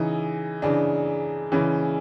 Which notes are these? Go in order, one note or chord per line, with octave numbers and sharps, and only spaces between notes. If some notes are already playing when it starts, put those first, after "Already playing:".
Already playing: C#3 E3 D#4
C#3 E3 D4
C#3 E3 C#4